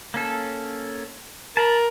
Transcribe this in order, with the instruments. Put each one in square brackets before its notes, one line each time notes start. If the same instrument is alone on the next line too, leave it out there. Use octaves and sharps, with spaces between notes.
[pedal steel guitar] A#3 C#4 A4
[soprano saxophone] A#4 [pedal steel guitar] A5 B5